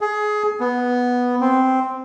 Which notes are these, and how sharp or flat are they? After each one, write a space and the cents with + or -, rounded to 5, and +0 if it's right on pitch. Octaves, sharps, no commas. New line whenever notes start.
G#4 +20
B3 -5
C4 -5